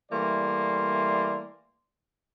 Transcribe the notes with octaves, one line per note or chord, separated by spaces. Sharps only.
E3 G3 A3 A#3 D5 C6